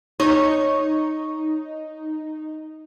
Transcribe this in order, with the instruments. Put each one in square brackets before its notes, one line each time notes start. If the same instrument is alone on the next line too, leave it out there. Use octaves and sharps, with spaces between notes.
[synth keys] D#4 [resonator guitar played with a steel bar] C#5